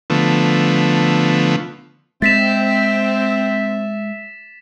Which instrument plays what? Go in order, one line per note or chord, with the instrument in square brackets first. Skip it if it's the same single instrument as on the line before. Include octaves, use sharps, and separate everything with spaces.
[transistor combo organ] D3 F3 A3 B3
[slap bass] G#3 [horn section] C4 [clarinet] E5 [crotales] A6 B6 E7